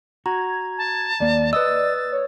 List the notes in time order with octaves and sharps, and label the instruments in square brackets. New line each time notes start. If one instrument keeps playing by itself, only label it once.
[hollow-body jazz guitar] F#4 [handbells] A#5 [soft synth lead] G#6
[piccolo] A5
[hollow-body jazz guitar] D#2 A#3 [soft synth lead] D5
[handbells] B4 D#6 E6 [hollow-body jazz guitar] D#5 [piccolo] A6
[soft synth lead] C#5